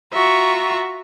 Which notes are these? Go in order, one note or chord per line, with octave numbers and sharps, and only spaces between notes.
F4 F#4 E5 A#5 C#6